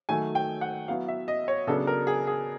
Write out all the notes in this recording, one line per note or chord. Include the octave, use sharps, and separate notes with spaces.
D#3 F#3 A3 G#5
G5
F#5
F#3 B3 E4 F5
E5
D#5
C#5
C#3 F#3 B3 D4 A4
A#4
G#4
G#4